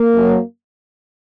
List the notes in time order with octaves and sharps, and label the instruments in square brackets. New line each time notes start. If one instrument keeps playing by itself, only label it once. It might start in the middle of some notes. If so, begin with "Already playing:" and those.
Already playing: [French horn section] A#3
F#2 F#3